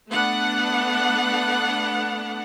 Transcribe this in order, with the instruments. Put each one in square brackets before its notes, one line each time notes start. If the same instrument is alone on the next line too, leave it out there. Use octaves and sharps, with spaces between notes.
[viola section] A3 B3 D4 F#5